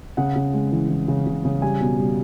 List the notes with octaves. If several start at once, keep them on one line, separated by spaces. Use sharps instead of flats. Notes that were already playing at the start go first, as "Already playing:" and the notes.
C#3 F#5
C#3
G#3
E3
E3
C#3
C#3
C#3
G3 G#5
B2
G3